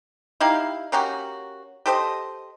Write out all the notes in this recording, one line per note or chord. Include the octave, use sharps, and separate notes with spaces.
D#4 E4 G4 F5
A#3 C#4 F#4 G4
G4 A4 C5 D#5